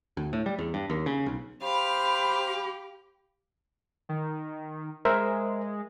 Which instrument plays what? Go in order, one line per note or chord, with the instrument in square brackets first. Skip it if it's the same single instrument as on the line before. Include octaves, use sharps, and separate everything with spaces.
[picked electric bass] D2
A2
G3
E2
G2
D#2
C#3
B1
[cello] G4 [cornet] C5 [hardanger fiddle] F5 [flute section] B5
[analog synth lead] D#3
[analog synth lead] G#3 [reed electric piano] A#4 C5 E5